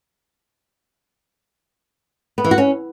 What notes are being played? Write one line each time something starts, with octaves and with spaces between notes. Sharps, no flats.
B3
E3
F#4
C#4